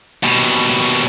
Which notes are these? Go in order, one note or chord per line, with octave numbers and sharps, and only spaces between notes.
D#2 B2